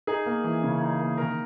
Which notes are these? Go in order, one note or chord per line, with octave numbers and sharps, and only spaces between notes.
D#4 G#4
A#3
E3
C#3
D#4
A#3
D#3 A#4